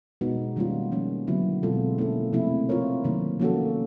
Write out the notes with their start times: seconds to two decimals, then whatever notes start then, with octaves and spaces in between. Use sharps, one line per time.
0.21 B2 G#3 B3 D#4 F#4
0.56 D#3 G3 A#3 C#4 F4
0.91 F3 A#3 C#4
1.27 D3 F#3 B3 E4
1.63 B2 G#3 C4 F4 A4
1.98 A#3 C#4 E4 A4
2.33 C3 F3 A3 C4 E4
2.69 C4 F4 A#4 C#5
3.04 C3 D#3 F#3 A#3
3.40 F3 A#3 C#4 F#4 A4